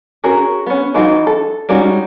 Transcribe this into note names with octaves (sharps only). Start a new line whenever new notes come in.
C#4 F#4 G#4 A#4
B3 C#4
E3 F#3 D#4 F4 F#4
A4
G3 G#3 C#4 D#4 F#4